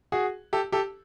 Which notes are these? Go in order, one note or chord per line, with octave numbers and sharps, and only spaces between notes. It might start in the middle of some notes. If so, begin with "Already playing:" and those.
F#4 G#4
G4 A4
G4 A4